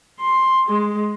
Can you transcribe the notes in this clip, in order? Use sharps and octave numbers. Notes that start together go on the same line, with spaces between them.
C6
G#3